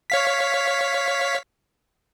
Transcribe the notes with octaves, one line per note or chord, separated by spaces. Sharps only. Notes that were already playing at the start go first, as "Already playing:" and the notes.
C#5 F5 B6